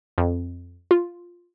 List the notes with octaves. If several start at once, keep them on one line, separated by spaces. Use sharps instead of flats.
F2
F4